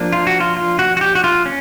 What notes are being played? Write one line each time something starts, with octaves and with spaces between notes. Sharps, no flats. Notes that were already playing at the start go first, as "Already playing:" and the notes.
Already playing: F3 A#3 D4
F4
F#4
F4
F4
F#4
F#4
G4
F#4
F4
C#4